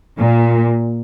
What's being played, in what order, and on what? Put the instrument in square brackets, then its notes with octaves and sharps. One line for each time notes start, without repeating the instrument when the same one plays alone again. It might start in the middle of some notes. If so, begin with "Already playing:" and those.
[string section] A#2